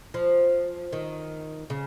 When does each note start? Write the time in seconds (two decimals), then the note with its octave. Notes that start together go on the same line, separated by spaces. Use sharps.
0.14 F3
0.92 D#3
1.70 C#3